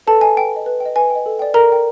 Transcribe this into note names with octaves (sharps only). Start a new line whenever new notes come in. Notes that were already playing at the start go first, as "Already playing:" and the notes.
A4 B4 A5
D#5 G5 G#5
B4 G5
D#5 G5
B4
G5
D#5
B4 G#5
G5
D#5
A4
D5 G5
A4 A#4 A#5
D5 G5